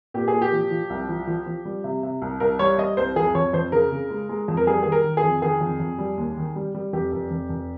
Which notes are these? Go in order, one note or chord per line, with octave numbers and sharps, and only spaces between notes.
A#2 G4
G#4
A#2
G4
F3
F3
C2
F3
F3
F3
G3
C3
C3
C2
C2 A#4
G3 C#5
G3 D#5
C2 C5
F2 G#4
F2 C#5
F2 C5
C#3 A#4
C#3
G#3
G#3
F2
A#4
G3 G#4
D#3 G#4
A#4
D#3
G#4
F2
D#3 G#4
F2
F2
G3
D#2
D#3
G3
G3
F1 G4
F1
F1
F1